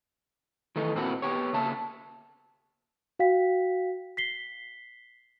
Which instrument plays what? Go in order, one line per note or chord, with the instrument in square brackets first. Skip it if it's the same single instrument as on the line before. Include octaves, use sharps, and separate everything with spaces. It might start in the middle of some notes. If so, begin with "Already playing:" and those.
[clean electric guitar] D#3 E3 A3 D#4
A#2 A#3 C4 E4 F#4
B3 G4 C#5
C#3 A#3 E5 A5
[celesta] F#4 F5 G5 B6
B6 C7 G7